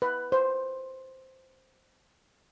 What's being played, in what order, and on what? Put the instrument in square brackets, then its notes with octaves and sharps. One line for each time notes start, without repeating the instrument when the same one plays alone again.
[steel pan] B4
C5